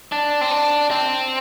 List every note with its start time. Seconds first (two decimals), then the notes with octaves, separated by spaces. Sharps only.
0.12 D4
0.41 C4
0.51 D4
0.91 C4